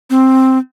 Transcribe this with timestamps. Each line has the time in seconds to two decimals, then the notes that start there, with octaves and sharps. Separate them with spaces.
0.10 C4